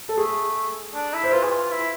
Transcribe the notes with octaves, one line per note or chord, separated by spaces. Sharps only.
A4
A3 G#4
D4
E4
C5
F4 B4
G#4
F4
E4